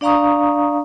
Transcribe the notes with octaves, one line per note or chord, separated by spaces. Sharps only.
D4 D5 F5 A#5 C#6 D#6